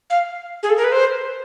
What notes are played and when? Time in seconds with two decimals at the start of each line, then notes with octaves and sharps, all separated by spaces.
0.10 F5
0.63 G#4
0.70 A4
0.77 A#4
0.84 B4
0.92 C5